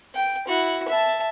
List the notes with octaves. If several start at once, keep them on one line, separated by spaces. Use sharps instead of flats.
G5
E4 F#4
E5 A5